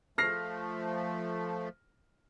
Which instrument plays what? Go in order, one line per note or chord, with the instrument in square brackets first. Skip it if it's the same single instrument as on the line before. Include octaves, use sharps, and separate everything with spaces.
[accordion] F3 A3 [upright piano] F6 A#6 C7